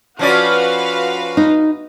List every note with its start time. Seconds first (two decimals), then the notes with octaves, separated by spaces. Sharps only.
0.19 F3 C#4 F#4 B4 D5 F5
1.37 D#4